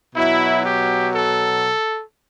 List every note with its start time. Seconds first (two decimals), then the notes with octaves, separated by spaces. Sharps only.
0.15 B2 F#3 E4
0.65 G4
1.13 A4